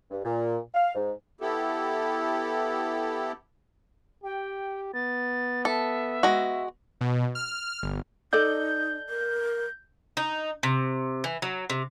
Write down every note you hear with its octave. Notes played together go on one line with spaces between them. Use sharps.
G2
A#2
F5
G#2
B3 E4 G4 A4
G4 G5
B3 A6
A4 E5
G#3 F#4
B2
F6
G1
D#4 A4 D5 D#5 G6
A#4
D#4
C3
E3
F#3
C3